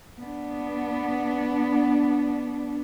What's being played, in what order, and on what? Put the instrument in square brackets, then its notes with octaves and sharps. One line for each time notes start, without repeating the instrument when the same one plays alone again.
[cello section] B3 D4